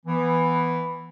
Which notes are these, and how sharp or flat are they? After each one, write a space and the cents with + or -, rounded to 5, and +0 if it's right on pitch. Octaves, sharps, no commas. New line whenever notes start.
E3 +0 B3 -10